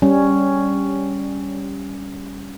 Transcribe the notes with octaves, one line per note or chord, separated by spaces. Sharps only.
G3 C#4